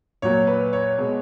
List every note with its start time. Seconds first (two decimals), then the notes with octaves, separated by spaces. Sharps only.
0.22 A#2 F#3 C#5
0.47 B4
0.73 C#5
0.98 B2 G#3